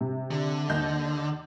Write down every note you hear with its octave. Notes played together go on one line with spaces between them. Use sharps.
C3
D3
D#2 D#5 G6